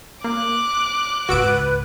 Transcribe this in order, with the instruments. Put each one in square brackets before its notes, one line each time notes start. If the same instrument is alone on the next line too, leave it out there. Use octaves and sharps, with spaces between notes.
[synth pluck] A#3 [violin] D6 F#6
[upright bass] C#2 G#2 [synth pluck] F#4 E6 D7 [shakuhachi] B4